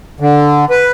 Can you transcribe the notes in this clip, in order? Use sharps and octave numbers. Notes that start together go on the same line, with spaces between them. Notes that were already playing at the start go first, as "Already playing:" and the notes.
D3
B4